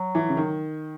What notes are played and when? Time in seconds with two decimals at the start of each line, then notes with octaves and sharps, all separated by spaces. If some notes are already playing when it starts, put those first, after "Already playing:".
Already playing: F#3
0.15 E3
0.29 C#3
0.37 D#3